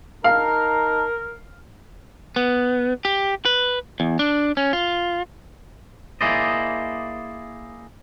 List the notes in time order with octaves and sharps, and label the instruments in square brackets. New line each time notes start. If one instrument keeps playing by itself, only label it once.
[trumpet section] D#4 A5 A#5 [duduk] A#4 [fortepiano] F5
[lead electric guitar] B3
G4
B4
E2
D4
C#4
F4
[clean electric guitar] A#3 E4 G#4 C5 D5 D#5